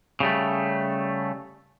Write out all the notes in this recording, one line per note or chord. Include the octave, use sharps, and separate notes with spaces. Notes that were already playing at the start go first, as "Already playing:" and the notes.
C#3 G3 A3